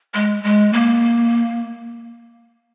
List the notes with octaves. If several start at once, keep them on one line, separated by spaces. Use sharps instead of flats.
G#3
G#3
A#3